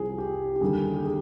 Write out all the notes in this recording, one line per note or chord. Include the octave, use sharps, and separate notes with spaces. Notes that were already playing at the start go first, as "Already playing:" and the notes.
Already playing: C2 C3 F3 G#4
G4
G4
D#2 D3 G3 G#4
G4
G#4